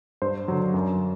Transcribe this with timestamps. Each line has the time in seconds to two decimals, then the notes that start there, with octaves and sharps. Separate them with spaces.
0.22 G2 C5
0.48 D3 F#3
0.74 F#2